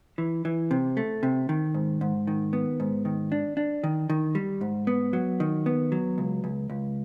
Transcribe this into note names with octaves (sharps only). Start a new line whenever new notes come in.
E3
E3
C3
A3
C3
D#3
G#2
G#2
D#3
B3
G#2
D#3
D4
D4
D#3
D#3
G3
G#2
B3
F#3
D#3
B3
F#3
C#2
C#2
C#2